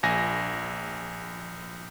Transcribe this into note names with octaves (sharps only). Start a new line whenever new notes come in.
A#1 G#5 A#6